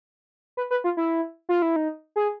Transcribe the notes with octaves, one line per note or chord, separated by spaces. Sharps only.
B4
B4
F4
E4
F4
E4
D#4
G#4